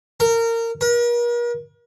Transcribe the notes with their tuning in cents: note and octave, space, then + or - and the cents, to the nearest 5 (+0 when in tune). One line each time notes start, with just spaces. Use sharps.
A#4 -25
A#4 +40